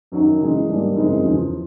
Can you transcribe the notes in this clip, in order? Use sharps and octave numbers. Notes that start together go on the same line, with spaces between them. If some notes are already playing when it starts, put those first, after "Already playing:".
F#2 D#3 F#3
C#3 E3 G#3
G#2 D#3 G3 A#3 D4
F#2 C#3 E3 G#3 C4
E2 C#3 F3